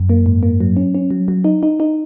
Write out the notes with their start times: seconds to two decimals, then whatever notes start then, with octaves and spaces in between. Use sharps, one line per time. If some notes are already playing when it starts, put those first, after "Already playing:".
Already playing: F#2
0.09 A#3
0.26 G#2
0.43 A#3
0.60 F#3
0.77 C#4
0.95 C#4
1.11 F#3
1.28 F#3
1.44 D#4
1.63 D#4
1.80 D#4